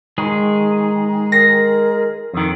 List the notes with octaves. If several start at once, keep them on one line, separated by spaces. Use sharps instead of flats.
D#3 G#3 G#4
A#4 A#6 C7
F2 D#3